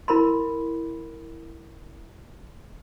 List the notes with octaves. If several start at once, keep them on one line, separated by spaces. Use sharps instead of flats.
E4 A#4 B5 C6